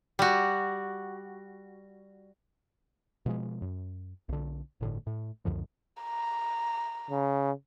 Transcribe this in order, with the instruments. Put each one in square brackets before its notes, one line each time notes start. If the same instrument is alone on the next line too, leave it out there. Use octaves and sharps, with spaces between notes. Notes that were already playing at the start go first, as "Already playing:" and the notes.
[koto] G3 F#4
[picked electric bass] B2 F3 G#3
F#2
B1 D3
G1 A2 D3
A2
C#2 F#2 D3 F3
[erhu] A#5
[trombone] C#3